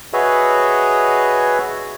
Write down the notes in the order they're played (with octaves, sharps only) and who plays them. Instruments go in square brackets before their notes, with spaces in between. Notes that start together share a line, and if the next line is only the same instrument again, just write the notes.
[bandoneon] F#4 G#4 B4 C#5 D#5 E5